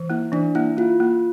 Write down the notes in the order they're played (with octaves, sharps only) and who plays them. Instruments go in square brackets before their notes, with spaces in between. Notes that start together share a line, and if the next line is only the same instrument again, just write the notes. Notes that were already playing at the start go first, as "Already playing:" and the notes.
Already playing: [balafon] E3
[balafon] A#3 [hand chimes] E4
[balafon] E3 [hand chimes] D4
[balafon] A#3 [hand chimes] E4
[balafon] A#3 [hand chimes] F4
[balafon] A#3